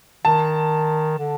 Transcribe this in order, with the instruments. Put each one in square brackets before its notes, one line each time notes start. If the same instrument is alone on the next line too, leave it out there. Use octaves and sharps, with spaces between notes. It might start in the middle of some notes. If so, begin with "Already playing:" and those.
[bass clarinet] D#3 [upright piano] A5
[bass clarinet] D3